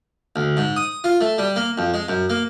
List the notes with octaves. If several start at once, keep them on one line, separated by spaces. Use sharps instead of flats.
D2
G#2
D#6
F4
A3
G3
A#3
F2
G#3
F#2
A#3